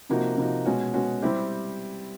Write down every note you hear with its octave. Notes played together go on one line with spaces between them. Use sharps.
C3 F3 A#3 D#4 F#4
C3 F3 A#3 D#4 F#4
B2 G#3 C#4 F#4
B2 G#3 C#4 F#4
G3 C4 E4 G4